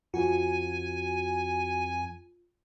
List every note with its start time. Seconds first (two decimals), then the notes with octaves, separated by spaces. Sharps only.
0.14 F2 F4 F#4 G#5